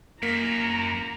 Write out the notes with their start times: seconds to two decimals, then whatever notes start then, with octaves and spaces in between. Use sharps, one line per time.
0.23 F#2 A#3 A#5